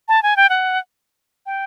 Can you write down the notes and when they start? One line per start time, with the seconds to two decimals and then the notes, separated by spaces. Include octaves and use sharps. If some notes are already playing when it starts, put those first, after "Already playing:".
0.08 A5
0.23 G#5
0.37 G5
0.49 F#5
1.46 G5